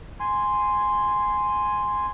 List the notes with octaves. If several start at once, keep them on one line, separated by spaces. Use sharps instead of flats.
G#5 C6